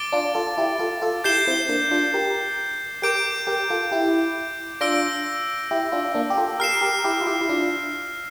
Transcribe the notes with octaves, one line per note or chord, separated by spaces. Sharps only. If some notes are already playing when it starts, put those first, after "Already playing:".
Already playing: D6 A6 D7 G7
D4 F4
F4 A4
E4 G4
F4 A4
F4 A4
E4 G4 G6 C7 E7 G7
C4 E4
A#3 D4
D4 F4
G4 A#4
G4 A#4 D6 G6 D7
G4 A#4
F4 A4
E4 G4
D4 F4 E6 A#6 D7 G7
E4 G4
D4 F4
A#3 D4
G4
F4 A4
G4 A#4 F6 C7 E7
G4 A#4
E4 G4
F4
E4 G4
E4
D4 F4